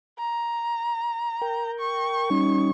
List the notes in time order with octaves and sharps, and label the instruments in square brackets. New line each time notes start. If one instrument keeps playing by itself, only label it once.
[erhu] A#5
[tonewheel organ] A#4 G5
[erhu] C#6
[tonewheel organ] G3 C#4 D#4